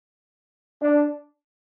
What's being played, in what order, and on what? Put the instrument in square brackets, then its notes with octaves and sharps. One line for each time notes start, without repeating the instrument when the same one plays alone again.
[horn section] D4